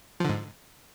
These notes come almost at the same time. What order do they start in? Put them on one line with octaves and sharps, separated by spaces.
F3 D3 G#2